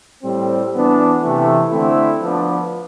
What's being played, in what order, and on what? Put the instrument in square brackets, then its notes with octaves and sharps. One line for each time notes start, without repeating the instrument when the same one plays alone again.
[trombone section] A2 G3 C4
E3 B3 D4
C3 E3 A3
D3 A3 C4 E4
F3 B3 D4